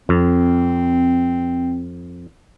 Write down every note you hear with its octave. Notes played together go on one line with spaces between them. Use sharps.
F2 C4